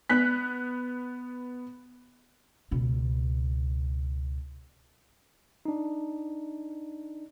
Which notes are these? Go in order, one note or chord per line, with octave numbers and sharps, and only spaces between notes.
B3 F#6 B6
C#2 B2
D4 D#4